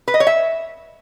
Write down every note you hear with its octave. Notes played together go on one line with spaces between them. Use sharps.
B4
D#5
C#5
E5